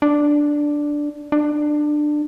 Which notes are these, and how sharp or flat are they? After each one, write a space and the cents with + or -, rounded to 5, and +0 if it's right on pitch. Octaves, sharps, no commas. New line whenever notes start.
D4 +0
D4 +20